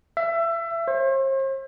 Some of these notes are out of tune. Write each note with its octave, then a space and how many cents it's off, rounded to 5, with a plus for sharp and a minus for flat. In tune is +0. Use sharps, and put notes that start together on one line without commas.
E5 +25
C5 +45